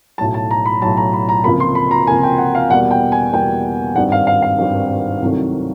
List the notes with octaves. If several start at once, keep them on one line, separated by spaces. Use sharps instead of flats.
B1 A2 F#3 A5
A5
A#5
B5
B1 A2 F#3 A5
A#5
B5
A#5
C#2 C3 F3 A#3 B5
C6
B5
A#5
C#2 C3 F3 A#3 G#5
G5
F#5
F5
E2 B2 G3 A#3 F#5
G5
G#5
E2 B2 G3 A#3 G5
G#1 G2 D#3 G3 C4 F#5
F5
F5
F5
G#1 G2 D#3 G3 C4
C2 C3 D#3 F#3 A3